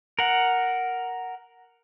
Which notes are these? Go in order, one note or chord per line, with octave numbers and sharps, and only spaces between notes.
A#4 F#5